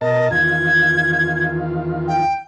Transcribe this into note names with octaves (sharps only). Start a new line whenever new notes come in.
B2 A#4 D#5 A5
E2 D#3 F4 G#6
G5